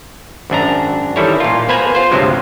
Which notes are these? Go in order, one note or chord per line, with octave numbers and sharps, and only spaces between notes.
G#1 F#2 D4 A#5
D#3 E3 G3 E4 A4 C#5
A#2 F4
A#3 B3 B4 C5 G#5 A#5
F4 C5
D2 G2 C3 F3 F#3 G#3